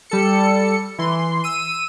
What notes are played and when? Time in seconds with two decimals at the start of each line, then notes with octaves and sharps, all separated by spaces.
0.10 G3 A4 C#7
0.99 E3 C6
1.44 E6 D#7